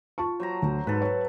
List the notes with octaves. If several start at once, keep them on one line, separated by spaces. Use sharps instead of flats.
F4 A5 C#6
F#3 C5 A#5
D2
G#2 A4 B4
C#5